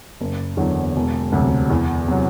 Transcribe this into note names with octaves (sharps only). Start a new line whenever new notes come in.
F#1
E2 D3 F#3
E1
D2 C3 F#3
E2
C3 F#3